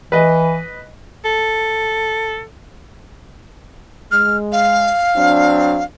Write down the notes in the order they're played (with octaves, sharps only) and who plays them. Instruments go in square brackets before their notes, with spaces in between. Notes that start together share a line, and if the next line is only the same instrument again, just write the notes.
[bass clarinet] E3 [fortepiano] B4 D#5
[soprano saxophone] A4
[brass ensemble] G#3 [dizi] F6
[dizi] F5
[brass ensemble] F#3 C4 D4